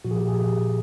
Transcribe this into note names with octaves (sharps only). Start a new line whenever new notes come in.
A#2 F3 F#4
G#4
G4
G#4